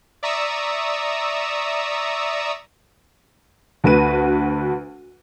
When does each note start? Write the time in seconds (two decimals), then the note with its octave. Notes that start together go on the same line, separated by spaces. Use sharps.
0.23 D5 E5 A#5 C#6 D#6 E6
3.84 D2 F#4 B4 D#7